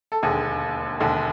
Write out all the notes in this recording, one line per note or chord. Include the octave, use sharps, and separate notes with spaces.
A4
E1 D#2 D3 G#4
E1 D#2 D3